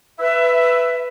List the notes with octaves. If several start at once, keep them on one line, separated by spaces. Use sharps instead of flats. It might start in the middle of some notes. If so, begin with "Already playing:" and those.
B4 E5